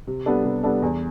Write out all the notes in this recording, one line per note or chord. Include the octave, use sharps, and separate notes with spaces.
C3
G3 B3 D4 A4
C3
G3 B3 D4 A4
E2